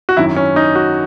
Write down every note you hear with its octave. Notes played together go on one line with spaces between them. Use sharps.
F#4
G#1 F#2 D#3 E4
C#4
D#4
F#4